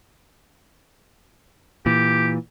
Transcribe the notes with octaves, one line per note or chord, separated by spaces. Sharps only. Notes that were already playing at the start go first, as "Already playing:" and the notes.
A#2 E3 G4